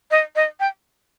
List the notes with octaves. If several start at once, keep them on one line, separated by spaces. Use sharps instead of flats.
D#5
D#5
G5